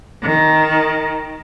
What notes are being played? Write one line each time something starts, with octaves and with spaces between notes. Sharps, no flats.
D#3